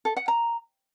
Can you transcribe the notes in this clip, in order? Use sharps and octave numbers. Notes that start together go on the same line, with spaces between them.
A4
F#5
A#5